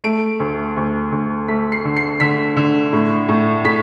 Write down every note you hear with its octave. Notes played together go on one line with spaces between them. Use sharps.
A3 D7
D2
D2
D2
A3 B6
C7
D3
C7
D3 B6
D3
A2
A2
A2 B6